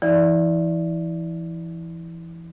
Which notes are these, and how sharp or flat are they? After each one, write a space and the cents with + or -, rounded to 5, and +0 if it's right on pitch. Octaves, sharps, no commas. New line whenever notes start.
E3 +30 E4 -35 D5 +0